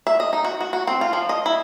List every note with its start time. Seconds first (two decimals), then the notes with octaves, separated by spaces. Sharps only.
0.07 E5
0.20 D#5
0.33 D#4
0.45 F#4
0.61 F#4
0.73 F#4
0.87 C4
1.01 F4
1.13 F3
1.29 D#5
1.46 E4